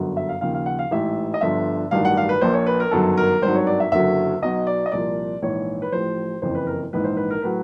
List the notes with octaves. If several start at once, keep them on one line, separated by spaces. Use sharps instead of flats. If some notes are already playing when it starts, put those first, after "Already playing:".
Already playing: G1 F#2 D3 F#3
E5
F5
D#2 C#3 F3 F5
F5
F#5
F5
A1 G#2 E3 E5
D#5
G1 G2 D3 F3 E5
A1 G2 D#3 F#3 F5
F#5
F5
B4
A#1 A#2 F3 C5
C#5
B4
A#4
G1 F#2 D#3 F#3 A4
A#4
G#1 G2 D#3 F#3 C5
C#5
D5
E5
F#1 F#2 D3 F#3 E5
B1 B2 F#3 D#5
D5
D#5
C2 A#2 F3 D5
A#1 G#2 E3 C#5
B4
A1 A2 F3 C5
F#1 F2 C#3 E3 C5
B4
A#4
A#1 G#2 E3 B4
C5
B4
A#4
A2 F#3 B4